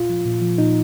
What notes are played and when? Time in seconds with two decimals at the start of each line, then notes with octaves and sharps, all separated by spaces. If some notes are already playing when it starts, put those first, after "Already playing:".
Already playing: A#2 F4
0.10 F3
0.26 A#2
0.42 F3
0.58 A#2 D#4